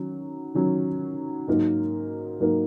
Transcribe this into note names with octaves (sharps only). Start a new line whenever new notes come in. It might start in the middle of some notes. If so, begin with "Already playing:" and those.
Already playing: D#3 F#3 C#4
D#3 F#3 C#4
G#2 F#3 A#3 D#4 A#4
G#2 F#3 A#3 D#4 A#4